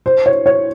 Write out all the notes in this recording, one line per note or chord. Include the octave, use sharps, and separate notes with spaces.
C5
C#5
C#5